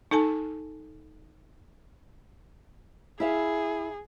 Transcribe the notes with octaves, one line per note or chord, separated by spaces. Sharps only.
D#4 A4 G#5 A5
E4 G#4 E5 F5